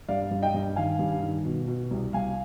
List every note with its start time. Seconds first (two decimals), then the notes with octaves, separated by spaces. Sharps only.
0.09 G2 D5 F5
0.31 G2
0.42 D#5 G5
0.54 G2
0.76 D#3 F5 G#5
0.99 G2
1.22 D#3
1.45 B2
1.67 B2
1.91 C2
2.13 C2 F5 G#5